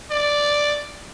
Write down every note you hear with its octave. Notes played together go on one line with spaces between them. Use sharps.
D5